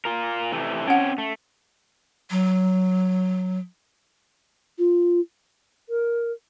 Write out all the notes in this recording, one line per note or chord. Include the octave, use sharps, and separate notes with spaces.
F4 A#4
C3 E3 A3
C4 C#4 C#5 F#5 G5
A3
F#3
F4
A#4